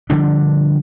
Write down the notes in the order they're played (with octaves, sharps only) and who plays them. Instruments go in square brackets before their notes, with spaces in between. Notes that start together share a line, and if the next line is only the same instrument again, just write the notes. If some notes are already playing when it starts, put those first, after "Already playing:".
[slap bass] D3 F3 G3 D4